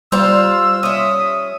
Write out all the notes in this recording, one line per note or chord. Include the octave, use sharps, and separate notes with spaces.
G3 F4 C5 F5 E6
C#4 E5 D#6